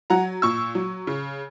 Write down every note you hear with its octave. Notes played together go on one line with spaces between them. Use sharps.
F#3 F#5 A#5
A#2 C#6 E6
F#3
C#3